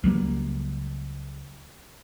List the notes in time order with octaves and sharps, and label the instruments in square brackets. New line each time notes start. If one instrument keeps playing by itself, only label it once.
[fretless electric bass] C#2 F#3 G3 A#3